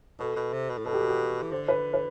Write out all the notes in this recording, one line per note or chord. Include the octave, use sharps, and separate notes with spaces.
B2 A4
B2
C3
B2
A2
B2 A4
G4
F#4
G4
E3
D3 C5
B4
B4